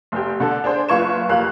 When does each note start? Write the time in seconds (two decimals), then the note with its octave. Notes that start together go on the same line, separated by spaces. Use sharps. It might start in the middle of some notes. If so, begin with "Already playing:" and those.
0.12 F1 G4
0.40 D3 A4
0.64 D4 G#4 C5
0.89 F#1 F4 B4 C#6 G#6 E7
1.29 F#1 F2 A#3 G4 F5 F#6